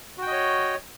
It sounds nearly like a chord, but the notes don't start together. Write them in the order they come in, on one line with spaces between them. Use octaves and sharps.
F#4 G5 D#5 C#5